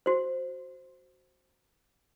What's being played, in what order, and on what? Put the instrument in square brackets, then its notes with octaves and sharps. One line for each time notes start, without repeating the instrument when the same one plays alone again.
[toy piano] F#4 C5